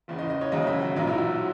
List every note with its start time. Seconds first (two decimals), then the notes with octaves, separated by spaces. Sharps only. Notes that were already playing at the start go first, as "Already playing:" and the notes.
0.08 F#1 E2 C#3
0.19 D#5
0.30 D#5
0.41 C#5
0.52 D#2 C#3 F#3 D#5
0.67 E5
0.82 F#4
0.96 B1 A#2 F#3 D#4
1.07 E4
1.18 F#4